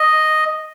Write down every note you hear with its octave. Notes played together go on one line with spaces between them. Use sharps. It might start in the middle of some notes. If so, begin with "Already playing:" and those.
Already playing: D#5